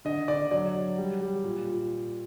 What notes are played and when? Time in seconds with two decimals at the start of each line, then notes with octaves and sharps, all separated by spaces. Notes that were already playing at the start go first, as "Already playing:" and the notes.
0.05 D3 D#5
0.28 D3 D5
0.51 F#3 D5
0.75 F#3
0.98 G3
1.21 G3
1.44 A#2
1.67 A#2